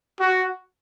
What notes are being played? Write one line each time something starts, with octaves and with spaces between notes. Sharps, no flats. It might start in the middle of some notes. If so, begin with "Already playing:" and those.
F#4